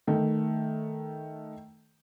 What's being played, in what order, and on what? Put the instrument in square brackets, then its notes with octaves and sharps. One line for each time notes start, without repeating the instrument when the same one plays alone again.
[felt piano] D#3 A3